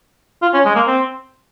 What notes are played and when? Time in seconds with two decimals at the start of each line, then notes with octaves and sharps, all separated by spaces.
0.42 F4
0.54 C#4
0.65 G#3
0.75 A#3
0.87 C4